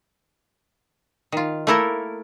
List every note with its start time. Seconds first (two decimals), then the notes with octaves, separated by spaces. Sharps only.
1.32 D#3 F4
1.67 A3 A#3 E4 A4 A#4